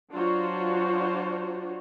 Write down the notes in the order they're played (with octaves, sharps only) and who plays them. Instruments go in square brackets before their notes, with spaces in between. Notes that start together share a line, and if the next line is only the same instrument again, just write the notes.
[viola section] F#3 D4 F4 F#4 C5 C#5